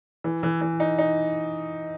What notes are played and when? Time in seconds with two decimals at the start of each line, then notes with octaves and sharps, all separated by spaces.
0.24 E3
0.43 E3
0.61 E3
0.80 D#4
0.98 D#4